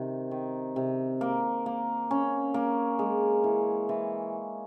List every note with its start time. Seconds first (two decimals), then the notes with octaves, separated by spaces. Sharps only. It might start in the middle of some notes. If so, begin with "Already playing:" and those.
Already playing: C3 D#3
0.31 D#3
0.76 C3
1.21 A#3
1.66 A#3
2.11 C#4
2.54 A#3
2.99 G#3
3.44 E3
3.89 E3